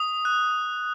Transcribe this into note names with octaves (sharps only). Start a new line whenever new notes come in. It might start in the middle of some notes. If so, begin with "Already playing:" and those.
Already playing: D#6
F#6